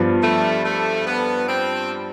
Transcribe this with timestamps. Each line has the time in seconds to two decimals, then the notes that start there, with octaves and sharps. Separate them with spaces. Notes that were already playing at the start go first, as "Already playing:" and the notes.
Already playing: G2 F3 B3 F4
0.22 A3
0.65 A3
1.07 B3
1.48 C4